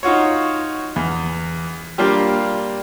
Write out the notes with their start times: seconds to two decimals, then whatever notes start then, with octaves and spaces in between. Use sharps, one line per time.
0.03 D#4 F4 F#4 C#5
0.96 E2
1.98 G3 A#3 D4 F4 G4